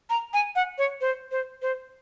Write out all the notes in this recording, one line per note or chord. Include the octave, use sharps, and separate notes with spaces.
A#5
G#5
F#5
C#5
C5
C5
C5